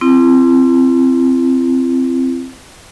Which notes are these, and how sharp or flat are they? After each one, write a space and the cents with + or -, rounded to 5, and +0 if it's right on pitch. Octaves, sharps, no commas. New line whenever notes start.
C4 +0 E4 +45